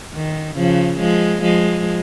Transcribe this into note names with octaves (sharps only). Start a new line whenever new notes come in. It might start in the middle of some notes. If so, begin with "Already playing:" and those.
D#3
C#3 F3
F3 G#3
F3 G#3